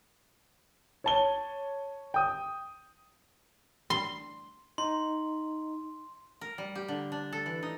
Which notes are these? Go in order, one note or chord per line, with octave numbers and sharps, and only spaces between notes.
C#5 A5 G7
G5 D#6
C6
D#4 C6
A#4
G3
G4
D3
D4
A4
E3
D#4